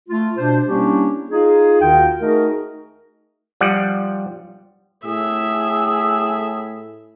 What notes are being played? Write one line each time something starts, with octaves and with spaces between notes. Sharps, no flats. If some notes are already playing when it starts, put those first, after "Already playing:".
A3 F4
B2 D4 C5
G3 A#3 C#4 D4 E4 G4
D#4 F4 G#4
D#2 D#3 F4 F#4 A#4 G5
A3 D#4 F#4 G#4 A#4
F3 G3 F#5
A2 G#4 E5 E6